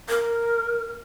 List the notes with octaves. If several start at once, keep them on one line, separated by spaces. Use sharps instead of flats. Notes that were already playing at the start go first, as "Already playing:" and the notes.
A#4